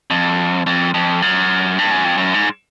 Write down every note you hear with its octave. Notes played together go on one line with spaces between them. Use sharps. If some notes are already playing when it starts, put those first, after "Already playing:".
F2
F2
F2
F#2
G2
F#2
F2
F#2
G#2